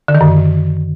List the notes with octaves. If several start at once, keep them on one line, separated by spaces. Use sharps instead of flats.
D3
D#3
F#2